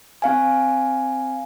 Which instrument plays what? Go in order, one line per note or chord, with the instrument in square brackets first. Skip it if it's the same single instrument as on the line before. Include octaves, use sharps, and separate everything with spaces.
[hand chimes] C4 F5 G#5